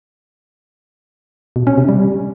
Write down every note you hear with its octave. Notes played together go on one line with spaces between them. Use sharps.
B2
C#4
C3
G3